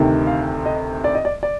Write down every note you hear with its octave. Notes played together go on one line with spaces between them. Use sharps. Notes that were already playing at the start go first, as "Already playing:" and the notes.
Already playing: D2 C3 D#3
F5
D#5
D5
D#5
D5
D5